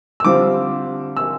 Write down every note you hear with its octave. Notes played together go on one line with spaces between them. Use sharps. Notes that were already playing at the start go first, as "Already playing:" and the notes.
E6
D3 G3 C4 F4 D6
E6